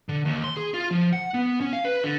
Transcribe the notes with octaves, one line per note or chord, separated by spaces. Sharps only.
D3
D#2
C6
G#4
F4
F3
F#5
B3
C#4
F5
B4
D3